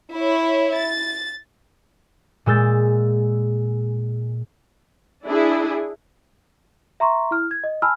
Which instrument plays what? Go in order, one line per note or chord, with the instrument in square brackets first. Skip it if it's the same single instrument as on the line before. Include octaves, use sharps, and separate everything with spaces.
[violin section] E4 C#5
A6
[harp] A#2 G#3 E6 G6 A6
[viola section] D4 E4 G#4
[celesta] E5 A#5 C6 C#6
E4 F6
G#6
D#5
G#5 A5 B5 E6 F6